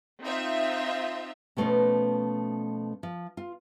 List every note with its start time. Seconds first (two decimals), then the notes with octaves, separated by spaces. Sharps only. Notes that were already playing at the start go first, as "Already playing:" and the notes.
0.22 C4 D#4 F4 E5
1.57 B2 F3 G3 A3 B3 C#4
3.03 F3
3.37 F4